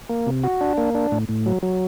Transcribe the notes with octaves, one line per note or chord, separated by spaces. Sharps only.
A#3
C3
F#4
D4
A#3
D4
A2
A2
F#3
F#3